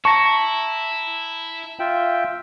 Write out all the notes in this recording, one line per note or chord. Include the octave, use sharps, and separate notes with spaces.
E4 A5 A#5 C#6 A#6
F4 E5 G5